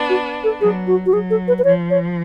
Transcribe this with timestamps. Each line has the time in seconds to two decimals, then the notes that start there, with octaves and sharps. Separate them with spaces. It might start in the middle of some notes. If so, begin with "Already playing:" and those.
Already playing: B3 D4
0.09 F#4
0.44 A4
0.61 F#3 G#4
0.87 F#4
1.06 F#4
1.13 F#3 G#4
1.30 A4
1.48 B4
1.59 B4
1.64 F3 C#5
1.90 C#5